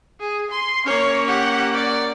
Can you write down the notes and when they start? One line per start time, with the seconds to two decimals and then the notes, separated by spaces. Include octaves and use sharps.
0.20 G#4
0.51 C6
0.86 A#3 C#4 C#5
1.27 G4 F#5
1.74 D5